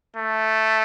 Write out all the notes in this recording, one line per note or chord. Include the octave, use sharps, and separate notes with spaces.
A3